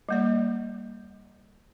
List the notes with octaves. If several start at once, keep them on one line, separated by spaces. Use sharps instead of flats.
G3 A#3 D5